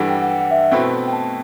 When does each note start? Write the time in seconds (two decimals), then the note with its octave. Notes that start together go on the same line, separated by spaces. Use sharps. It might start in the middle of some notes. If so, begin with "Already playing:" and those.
Already playing: G2 E3 G3 D4 A4 F#5
0.09 G5
0.22 F#5
0.29 G5
0.40 F#5
0.51 E5
0.71 B2 A3 C4 E4 B4 G5
1.08 G5
1.13 A5